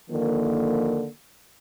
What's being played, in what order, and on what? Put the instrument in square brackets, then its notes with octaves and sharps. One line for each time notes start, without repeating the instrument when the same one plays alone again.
[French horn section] D3 D#3 F3 A#3